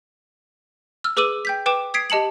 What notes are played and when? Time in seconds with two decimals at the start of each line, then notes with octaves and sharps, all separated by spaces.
1.04 E6 F6
1.17 G#4 B4 D6 E6 D#7 F#7
1.45 G5 G6 B6
1.66 B4 G5 D6 E7
1.94 D#6 G#6 B6 C7 D7
2.10 G4 D#5 A5 C#7 F#7